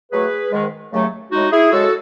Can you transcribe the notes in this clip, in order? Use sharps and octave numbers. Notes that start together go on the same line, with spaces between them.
A2 F#3 A3 G#4 B4
G#2 D#3 G#3
D#2 C#3 F#3 A3
A2 G#3 D#4 F#4
E4 G#4
F#2 C#3 G#3 F#4 A4